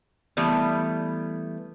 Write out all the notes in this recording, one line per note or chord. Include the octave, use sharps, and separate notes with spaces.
E3 G3 A3 B3